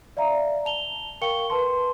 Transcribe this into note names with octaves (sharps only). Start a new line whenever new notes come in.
D5 E5 F5 A#5
A5 F7 G7
A#4 F5 G5 C#6 C#7 G7
B4 A5 C6